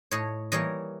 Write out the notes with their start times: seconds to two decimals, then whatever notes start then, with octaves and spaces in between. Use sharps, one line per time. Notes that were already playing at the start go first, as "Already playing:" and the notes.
0.11 A2 C#5 D#5
0.52 E3 G3 A#3 C#5 D#5